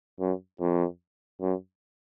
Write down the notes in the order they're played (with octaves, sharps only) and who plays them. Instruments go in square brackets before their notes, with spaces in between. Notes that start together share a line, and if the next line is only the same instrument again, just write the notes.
[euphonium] F#2
F2
F#2